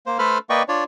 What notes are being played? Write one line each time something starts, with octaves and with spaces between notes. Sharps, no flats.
A#3 C5
A3 A4 B4 C5 B5 F6
A#3 B4 D5 D#5 G5 C#6
D4 F4 C#5 D5